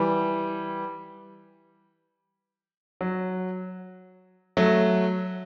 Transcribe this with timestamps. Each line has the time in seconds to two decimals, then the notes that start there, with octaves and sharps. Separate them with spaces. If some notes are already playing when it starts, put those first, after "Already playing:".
Already playing: E3 G3
3.01 F#3
4.57 F#3 A3